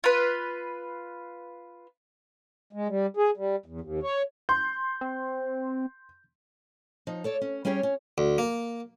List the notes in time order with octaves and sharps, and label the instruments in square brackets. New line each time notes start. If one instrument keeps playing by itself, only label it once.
[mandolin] F4 B4
[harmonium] G#3
G3
G#4
G3
E2
D#2
C#5
[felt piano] C6 [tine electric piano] G6
[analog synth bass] C4
[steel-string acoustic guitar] F3 D#4
A4 C#5 D5
C#4
G3 C#4 G4 G#4 B4 C#5
C#4
[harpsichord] D2
A#3